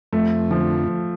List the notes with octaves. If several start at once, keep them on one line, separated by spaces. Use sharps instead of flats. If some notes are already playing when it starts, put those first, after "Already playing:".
F2 A3
D3 F3